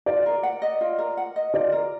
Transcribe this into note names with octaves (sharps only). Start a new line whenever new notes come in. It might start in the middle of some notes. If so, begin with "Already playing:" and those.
F4 D5
A#4
F#5
D#5
F4
A#4
F#5
D#5
F4 D5
A#4